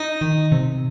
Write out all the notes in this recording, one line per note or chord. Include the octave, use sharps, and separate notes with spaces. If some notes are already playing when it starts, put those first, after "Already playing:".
Already playing: D#4
D#3
C3